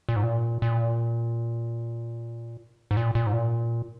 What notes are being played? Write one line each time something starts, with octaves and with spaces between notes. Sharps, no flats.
A#2
G#2
A#2
A#2
G#2
A#2
A#2
G#2
A#2